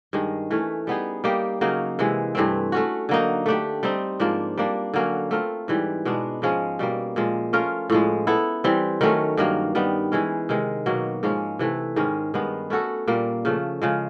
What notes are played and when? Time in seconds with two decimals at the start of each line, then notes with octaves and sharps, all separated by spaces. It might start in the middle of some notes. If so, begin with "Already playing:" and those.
0.13 G2 D#3 G#3
0.51 E3 A3 C#4
0.87 G3 B3 D#4 G#4
1.24 G3 A#3 D#4 G4
1.61 C#3 F#3 A#3 D#4
1.99 C3 E3 G#3
2.35 G2 E3 A3 C4
2.72 A3 C#4 F#4
3.09 D3 F#3 A#3 D#4
3.46 A3 D4 G4
3.83 G3 C4 D#4
4.20 G#2 F3 A#3 D4
4.58 G3 A#3 D4
4.94 D3 F#3 A#3 C#4
5.31 A3 C4 F4 A#4
5.68 G#2 E3 G3
6.05 B2 G#3 B3 D4
6.42 G#2 F3 G#3 C#4
6.79 B2 G3 A#3
7.16 A#2 F3 G#3
7.53 A3 C#4 F4 A#4
7.90 A2 F3 G#3
8.27 B3 E4 A4
8.64 E3 G3 C4
9.01 D#3 F#3 A3 C#4
9.37 G2 D#3 F#3 A#3
9.75 D#3 G3 B3
10.12 E3 G#3 C#4
10.49 C3 D#3 G#3
10.86 B2 F#3 A#3
11.23 G#2 F3 G#3 C#4
11.59 C3 E3 A3
11.96 G#2 D#3 G#3 C#4
12.34 G2 D#3 G#3 B3
12.70 A3 C#4 F#4 A4
13.08 A#2 G3 A#3
13.45 C#3 F3 A3
13.82 C#3 F3 G#3